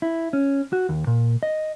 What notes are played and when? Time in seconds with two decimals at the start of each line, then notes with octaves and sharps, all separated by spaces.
0.02 E4
0.33 C#4
0.73 F#4
0.89 D#2
1.07 A#2
1.43 D#5